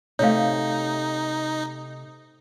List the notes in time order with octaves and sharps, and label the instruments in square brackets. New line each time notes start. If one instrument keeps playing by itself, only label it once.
[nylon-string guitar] C3 A3 [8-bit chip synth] D#4 [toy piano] C#5 F5